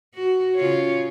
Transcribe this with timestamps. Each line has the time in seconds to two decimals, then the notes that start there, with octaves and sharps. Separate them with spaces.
0.14 F#4
0.55 C#3 F4 C#5